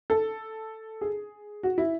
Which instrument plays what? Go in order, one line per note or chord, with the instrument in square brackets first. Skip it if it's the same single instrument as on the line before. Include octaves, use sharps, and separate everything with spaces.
[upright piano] A4
G#4
F#4
E4